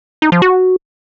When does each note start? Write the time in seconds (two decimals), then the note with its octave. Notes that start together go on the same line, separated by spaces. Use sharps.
0.22 D#4
0.32 F3
0.42 F#4